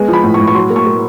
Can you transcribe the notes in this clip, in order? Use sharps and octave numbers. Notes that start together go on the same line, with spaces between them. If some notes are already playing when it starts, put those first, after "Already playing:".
Already playing: G#3 B3
F3
B5
A2
C#6
A2
C#6
F#3 C6
A#3
C#6
A#3